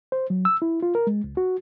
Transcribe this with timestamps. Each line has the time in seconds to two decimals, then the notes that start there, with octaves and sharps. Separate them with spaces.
0.12 C5
0.30 F#3
0.45 E6
0.62 E4
0.83 F4
0.95 A#4
1.07 G#3
1.24 C#2
1.37 F#4